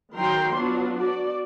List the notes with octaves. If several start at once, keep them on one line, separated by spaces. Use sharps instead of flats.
D#3 F#3 A#4 G5 A#5 C6
F#3 B3 D4 F4 F#4
F#4 D5